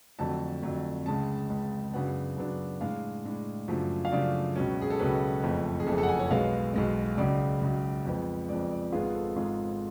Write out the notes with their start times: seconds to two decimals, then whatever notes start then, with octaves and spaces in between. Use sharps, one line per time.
0.19 F2 D3 F#3 A3 A5
0.62 F2 D3 F#3 A3
1.06 C#2 C#3 G#3 A5
1.50 C#2 C#3 G#3
1.93 F#2 C#3 F#3 B3 D4 F#5
2.37 F#2 C#3 F#3 B3 D4
2.81 A2 G#3 D4 F5
3.25 A2 G#3 D4
3.68 F#2 C#3 F3 A3 D4
4.05 F5
4.12 F#2 C#3 F3 A3 D4 D5
4.56 C#2 B2 F#3 C#4
4.82 G#4
4.90 A4
4.99 C#2 B2 F#3 C#4 B4
5.43 F#1 F2 F3 A3
5.80 G#4
5.87 F#1 F2 F3 A3 A4
5.98 A4
6.03 F#5
6.09 G#5
6.19 C#5
6.31 B1 B2 G#3 B3 F5
6.74 B1 B2 G#3 B3
7.17 C#2 C#3 F#3 D5
7.61 C#2 C#3 F#3
8.05 F2 F3 G#3 B3
8.49 F2 F3 G#3 B3 D5
8.71 D5
8.92 G#1 G#2 G#3 B3 F4 G#4
9.15 A4
9.36 G#1 G#2 G#3 B3 F4 G#4